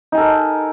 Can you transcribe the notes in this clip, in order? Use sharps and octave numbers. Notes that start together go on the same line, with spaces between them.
D#4 A4 A#4 G#5